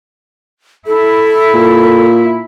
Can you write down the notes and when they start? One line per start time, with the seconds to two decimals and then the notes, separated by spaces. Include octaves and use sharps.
0.86 E4 A4
1.54 A#2